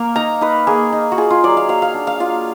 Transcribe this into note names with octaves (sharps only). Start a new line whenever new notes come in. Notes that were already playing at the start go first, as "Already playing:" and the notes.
Already playing: A#3 F5
D#4 A#5
D#4 B4
A#3 G#4
D#4
F#4
F4 G#4
F4
F#3 D5
F5
F#3 F5
F5
D4
F5
F4 F5